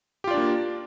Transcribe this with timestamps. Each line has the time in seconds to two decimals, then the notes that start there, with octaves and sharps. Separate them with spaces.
0.24 G4
0.27 F4
0.31 D5
0.34 D4
0.37 A#3